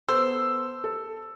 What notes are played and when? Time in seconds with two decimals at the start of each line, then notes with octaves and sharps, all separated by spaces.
0.09 B3 A4 C5 E6
0.84 A4